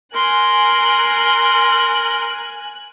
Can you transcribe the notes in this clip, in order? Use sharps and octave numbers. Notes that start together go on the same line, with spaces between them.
A#4 G#5 C6 F#6